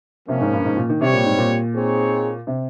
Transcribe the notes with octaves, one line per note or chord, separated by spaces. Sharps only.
C3 F3 A#3 C#4
G#2
G2
G#2
A#2
D#3
C3 G3 C4 G4 C#5
A#2
G#2
A#2
C4 D#4 G#4 C#5
C3